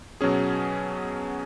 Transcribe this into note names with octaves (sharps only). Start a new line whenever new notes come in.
B2 F#3 C#4 G#4